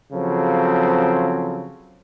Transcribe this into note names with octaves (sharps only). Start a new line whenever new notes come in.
C#3 F3 F#3 C4 A4